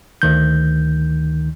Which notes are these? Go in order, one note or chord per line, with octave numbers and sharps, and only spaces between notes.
D2 D#3 G6